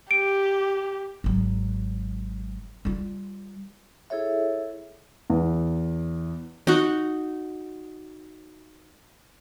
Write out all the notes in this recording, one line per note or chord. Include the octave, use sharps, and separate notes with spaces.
G4 D7
G#1 F#3
G3 F4
E4 G#4 A4 C#5 E5
E2
D#4 F#4